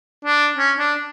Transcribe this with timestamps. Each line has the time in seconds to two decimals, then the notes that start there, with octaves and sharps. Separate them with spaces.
0.25 D4
0.57 C#4
0.79 D4